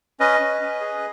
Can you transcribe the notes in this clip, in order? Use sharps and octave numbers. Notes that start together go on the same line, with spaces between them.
C#4 B4 D#5
C#4
C#4
G#4